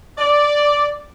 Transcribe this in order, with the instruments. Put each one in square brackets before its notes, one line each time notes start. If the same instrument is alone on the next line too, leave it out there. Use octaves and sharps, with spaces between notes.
[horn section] D5